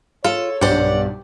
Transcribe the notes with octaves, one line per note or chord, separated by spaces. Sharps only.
F4 A4 C#5
B1 G2 G4 C5 D5 F#5